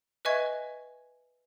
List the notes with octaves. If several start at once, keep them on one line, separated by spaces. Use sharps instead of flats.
B4 D#5 E5 G#5 C#6 G#6